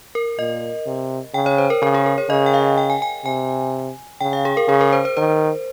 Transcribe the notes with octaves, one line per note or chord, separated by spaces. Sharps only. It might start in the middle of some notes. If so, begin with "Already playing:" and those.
A#4
A#2 D#5
C3
C#3 G5
C#5
C5
A#4
C#3 A#4
G#4
A#4
C#5
C#3 D#5
G5
F5
G5
G#5
G#5
C3 G#5
C#3 G5
F5
G#4
A#4
C#3 G#4
A#4
C5
C5
D#3 C5